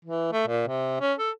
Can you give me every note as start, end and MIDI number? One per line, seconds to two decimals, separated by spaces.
0.05 0.32 52
0.33 0.43 57
0.48 0.64 46
0.68 1.00 48
1.01 1.14 61
1.19 1.31 69